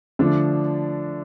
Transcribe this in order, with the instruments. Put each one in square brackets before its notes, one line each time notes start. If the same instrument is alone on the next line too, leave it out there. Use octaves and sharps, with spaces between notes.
[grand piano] D3 F3 A3 D4